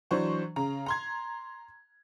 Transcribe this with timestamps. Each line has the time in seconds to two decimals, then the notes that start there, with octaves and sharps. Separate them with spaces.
0.11 E3 F#3 D4 C5 C#6
0.56 C#3 A#5
0.86 A#5 C6 G#6